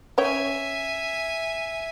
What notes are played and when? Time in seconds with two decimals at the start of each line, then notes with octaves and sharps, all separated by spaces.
0.18 C#4 C#5 E5 G5 G#5